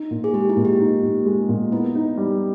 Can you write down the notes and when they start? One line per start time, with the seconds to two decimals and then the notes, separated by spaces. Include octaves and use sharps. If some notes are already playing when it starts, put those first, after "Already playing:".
Already playing: D#4
0.11 A#2
0.24 G#4
0.34 G#3 G4
0.49 E4
0.57 A#2
0.65 G4
0.80 D#4
1.03 A#2
1.26 G#3
1.49 A#2
1.72 B3 E4
1.95 D#4
2.17 G3